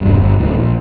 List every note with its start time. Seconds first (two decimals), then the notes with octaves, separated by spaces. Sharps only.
0.01 E1 C2 G2
0.20 G1
0.38 D1 C2 A2
0.53 A#1